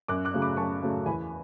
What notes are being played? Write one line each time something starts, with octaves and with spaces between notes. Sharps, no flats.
F#2 D6 F#6
D6 F#6
C#3 F#3 A3
B5 D6
F#2 A5 C#6
C#3 F#3 A3
E2 G#5 B5